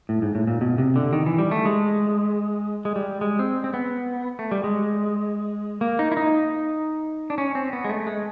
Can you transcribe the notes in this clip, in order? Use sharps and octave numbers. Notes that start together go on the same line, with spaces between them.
A2
G#2
A2
A#2
B2
C3
D3
D#3
E3
G3
A3
G#3
G#3
G3
G#3
C4
C4
B3
A3
G3
G#3
A#3
D#4
E4
D#4
D4
C#4
C4
B3
G#3
A3
G#3